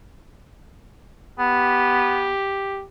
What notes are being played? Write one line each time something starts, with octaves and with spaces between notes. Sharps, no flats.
B3 G4